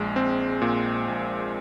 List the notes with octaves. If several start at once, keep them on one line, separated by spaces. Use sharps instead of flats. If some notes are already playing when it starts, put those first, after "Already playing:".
Already playing: A#1 G#3
C4
A#2
A#1